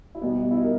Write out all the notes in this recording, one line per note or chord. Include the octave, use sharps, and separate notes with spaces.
E4
B2 G3 B3 D#4
E4
D#4
A#4